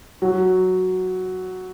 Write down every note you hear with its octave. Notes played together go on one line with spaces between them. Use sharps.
F#3